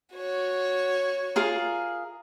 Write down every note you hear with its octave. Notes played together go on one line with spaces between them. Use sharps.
F#4 C#5
F4 G#4 A#4